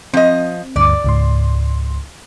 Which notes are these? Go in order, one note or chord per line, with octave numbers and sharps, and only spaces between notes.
F3 C4 D#5
D2 G2 D5
C#2 G#2 C6